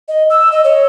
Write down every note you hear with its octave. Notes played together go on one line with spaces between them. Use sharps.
D#5
E6
D#5
C#5